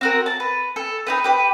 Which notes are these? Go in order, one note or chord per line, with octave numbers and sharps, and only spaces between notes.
C4 F#4 A#4
A5
B4
A4
D#4 G4 B4
G4 B4